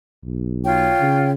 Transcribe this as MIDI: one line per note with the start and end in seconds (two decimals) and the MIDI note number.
0.24 0.94 35
0.64 1.30 65
0.64 1.30 73
0.64 1.30 79
1.00 1.34 49